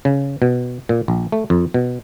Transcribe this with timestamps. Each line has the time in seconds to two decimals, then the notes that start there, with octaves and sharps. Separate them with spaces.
0.05 C#3
0.42 B2
0.89 A#2
1.08 A#1
1.32 A3
1.50 F2
1.74 B2